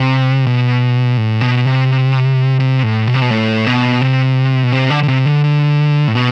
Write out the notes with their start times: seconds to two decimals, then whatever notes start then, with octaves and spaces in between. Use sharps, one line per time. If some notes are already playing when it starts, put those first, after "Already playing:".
Already playing: C3
0.47 B2
1.17 A2
1.41 B2
1.65 C3
2.60 C3
2.83 A2
3.07 B2
3.14 C3
3.22 B2
3.31 A2
3.67 B2
4.01 C3
4.63 B2
4.72 C3
4.90 D3
5.03 D3
5.08 C3
5.26 D3
5.44 D3
6.08 A2
6.15 B2